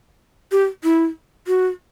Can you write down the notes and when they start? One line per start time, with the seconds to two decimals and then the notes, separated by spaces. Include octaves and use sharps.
0.52 G4
0.84 E4
1.47 F#4